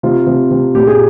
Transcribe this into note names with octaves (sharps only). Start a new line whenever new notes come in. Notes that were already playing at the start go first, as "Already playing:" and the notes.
C3 F4
C3
C3
A#2 G4
G#4